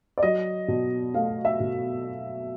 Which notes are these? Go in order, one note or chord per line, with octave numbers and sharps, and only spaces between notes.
D5
F#3 D#5
B2
A3 F5
E5
B2